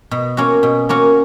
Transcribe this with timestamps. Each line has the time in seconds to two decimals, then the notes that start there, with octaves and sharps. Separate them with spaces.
0.11 B2
0.37 A#3 C#4 F#4
0.63 B2
0.89 A#3 C#4 F#4